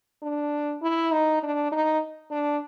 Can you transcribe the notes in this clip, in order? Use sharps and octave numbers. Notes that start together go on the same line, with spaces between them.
D4
E4
D#4
D4
D#4
D4